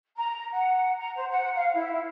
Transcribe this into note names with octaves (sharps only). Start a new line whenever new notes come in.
A#5
F#5
A#5
C5
F#5
F5
E4